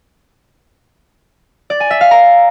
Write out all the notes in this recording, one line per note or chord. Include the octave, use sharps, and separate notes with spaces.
D5
G#5
E5
F5
A#5